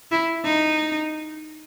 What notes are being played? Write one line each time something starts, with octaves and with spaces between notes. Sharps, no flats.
E4
D#4